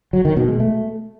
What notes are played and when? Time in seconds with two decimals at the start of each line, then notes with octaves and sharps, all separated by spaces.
0.13 F#3
0.25 D#3
0.37 B2
0.48 G#3
0.60 A3